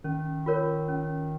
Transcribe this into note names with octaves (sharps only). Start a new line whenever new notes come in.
D#3 C#4
F4 A#4 C#5
C#4